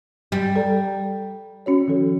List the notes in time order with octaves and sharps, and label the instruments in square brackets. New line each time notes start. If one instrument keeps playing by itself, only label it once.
[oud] G3
[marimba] A4 D5 A#5
C#4 F#4 C#5
D#3 F3 A4